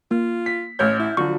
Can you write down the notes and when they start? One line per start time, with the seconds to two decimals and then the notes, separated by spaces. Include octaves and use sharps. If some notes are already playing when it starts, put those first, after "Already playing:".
0.11 A#3 F4
0.46 B6
0.79 A1 C#5 F6 G6
0.99 E4
1.17 D3 F3 F#3 F#4 C#6